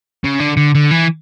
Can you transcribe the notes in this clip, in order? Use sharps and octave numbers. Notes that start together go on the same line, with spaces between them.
C#3
D3
D3
D3
E3